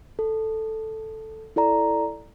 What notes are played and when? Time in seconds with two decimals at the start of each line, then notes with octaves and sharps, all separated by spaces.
0.19 A4
1.56 E4 A4 D5 A#5